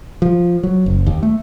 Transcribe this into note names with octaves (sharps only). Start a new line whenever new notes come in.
F3
F#3
F#1
D#2
A3